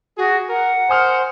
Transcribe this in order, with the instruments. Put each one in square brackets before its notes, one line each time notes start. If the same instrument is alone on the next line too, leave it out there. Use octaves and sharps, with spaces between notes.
[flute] F#4 [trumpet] G#4
[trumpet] A#4 [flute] F#5
[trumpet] C5 [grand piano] G#5 D#6 F6